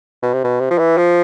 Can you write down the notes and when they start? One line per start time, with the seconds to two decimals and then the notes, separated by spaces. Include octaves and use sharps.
0.22 B2
0.33 C3
0.44 B2
0.60 C3
0.71 F3
0.78 E3
0.97 F3